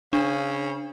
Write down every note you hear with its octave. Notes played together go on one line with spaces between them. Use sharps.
C#3 D4